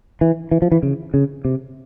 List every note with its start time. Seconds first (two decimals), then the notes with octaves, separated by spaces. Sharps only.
0.21 E3
0.51 E3
0.62 F3
0.72 E3
0.83 C#3
1.14 C#3
1.45 C3